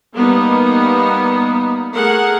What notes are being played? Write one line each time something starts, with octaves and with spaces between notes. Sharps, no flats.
G3 A#3 B3 D#4
A3 G#4 A#4 F#5